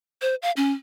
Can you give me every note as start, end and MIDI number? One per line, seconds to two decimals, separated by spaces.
0.22 0.35 72
0.42 0.51 77
0.57 0.72 61